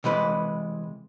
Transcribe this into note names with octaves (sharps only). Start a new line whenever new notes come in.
C3 E3 G#3 B4